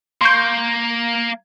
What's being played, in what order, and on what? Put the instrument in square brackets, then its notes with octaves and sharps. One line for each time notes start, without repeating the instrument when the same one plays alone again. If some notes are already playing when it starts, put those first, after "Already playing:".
[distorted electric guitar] A#3 [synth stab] C6 C#6 G6